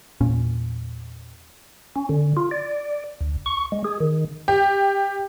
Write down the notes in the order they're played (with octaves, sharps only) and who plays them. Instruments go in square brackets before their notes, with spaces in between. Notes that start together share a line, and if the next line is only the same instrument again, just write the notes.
[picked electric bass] E2 A#2 C#4
[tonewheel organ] C#4
D3
F4
D5
D2
C#6
G#3
G#4
D#3
[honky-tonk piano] G4